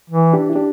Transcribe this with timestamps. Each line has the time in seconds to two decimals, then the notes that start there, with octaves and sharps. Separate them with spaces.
0.10 E3
0.33 D4 G4
0.49 E4
0.56 D4 G4